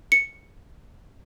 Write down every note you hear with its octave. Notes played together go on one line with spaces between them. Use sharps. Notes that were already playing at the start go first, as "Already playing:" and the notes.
C#7